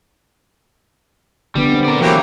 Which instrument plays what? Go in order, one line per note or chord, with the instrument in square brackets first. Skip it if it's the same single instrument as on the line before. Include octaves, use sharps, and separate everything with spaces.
[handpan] D3 B3 [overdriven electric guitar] G3
[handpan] C4
[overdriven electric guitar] A#4 D5
[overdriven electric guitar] E3 [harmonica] F#3 A#3 G4